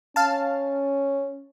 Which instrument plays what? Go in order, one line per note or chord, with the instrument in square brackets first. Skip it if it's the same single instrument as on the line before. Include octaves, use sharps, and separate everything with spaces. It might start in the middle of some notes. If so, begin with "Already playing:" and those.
[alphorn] C#4 [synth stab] F5 A5